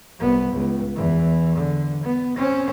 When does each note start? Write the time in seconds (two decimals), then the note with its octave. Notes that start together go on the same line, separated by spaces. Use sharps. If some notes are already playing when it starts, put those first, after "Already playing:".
0.19 C2 B3
0.52 C#2
0.95 E2 E3
1.56 D3
2.04 B3
2.37 C4 C#4